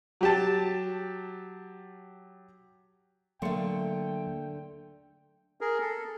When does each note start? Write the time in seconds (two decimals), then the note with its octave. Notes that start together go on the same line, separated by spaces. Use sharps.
0.21 F#3 G4 A5
3.42 D3 F#3 A3 A#3 G5 C6 C#7
5.61 G#4 A#4
5.81 A4